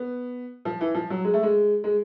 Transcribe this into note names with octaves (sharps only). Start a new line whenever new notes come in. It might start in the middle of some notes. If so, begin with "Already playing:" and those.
Already playing: B3
F3
E3
F3
F#3
G#3
A3
G#3
G#3